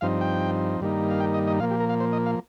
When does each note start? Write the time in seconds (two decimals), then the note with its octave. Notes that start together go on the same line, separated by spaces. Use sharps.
0.01 G2 F3 C4 D#4 F5
0.21 G5
0.80 G2 D#3 G3 A#3 D#4
1.10 F5
1.20 G5
1.34 D#5
1.47 D#5
1.60 A#2 F3 A#3 F5
1.70 G4
1.80 A#4
1.89 F5
2.00 C5
2.13 D#5
2.26 F5